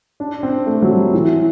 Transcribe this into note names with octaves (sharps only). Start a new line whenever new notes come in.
D4
C4
A3
F#3
G3
E3